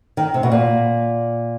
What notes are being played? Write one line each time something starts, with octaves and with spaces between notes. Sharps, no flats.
D#3
C3
B2
A#2